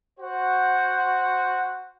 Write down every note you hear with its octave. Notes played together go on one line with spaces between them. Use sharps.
F#4 C5 F#5